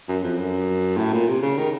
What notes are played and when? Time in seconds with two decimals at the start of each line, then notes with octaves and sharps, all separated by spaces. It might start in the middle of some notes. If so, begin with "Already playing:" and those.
0.08 F#2
0.23 F2
0.38 F#2
0.97 A2
1.13 A#2
1.28 C3
1.42 C#3
1.58 D#3